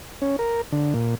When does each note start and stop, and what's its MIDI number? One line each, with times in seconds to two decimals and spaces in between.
0.22 0.36 61
0.39 0.61 70
0.72 0.94 50
0.94 1.15 46